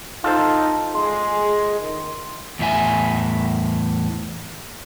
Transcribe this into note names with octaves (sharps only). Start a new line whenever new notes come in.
D#4 F4 A4 C5
G#3 G#4 C6
D#3
E2 A2 E5 G#5